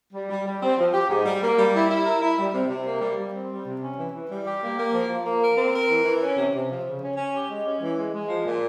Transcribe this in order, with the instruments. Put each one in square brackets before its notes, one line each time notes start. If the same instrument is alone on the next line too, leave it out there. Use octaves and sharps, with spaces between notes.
[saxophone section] G3
G3
G3
C4
F3
G4
G#2
G3
A#3
G3
E4
E4
A#4
E4
G3
C3
C3
A#3
G3
G3
C4
G3
C3
C#4
E3
E3
G3
G4
A#3
A#3
F3
F3
A#3
A#4
C4
A#4
E3
E3
C#4
C3
C3
F3
C#3
C#4
C#4
G4
G#3
C#4
E3
G#3
G#3
F3
A#2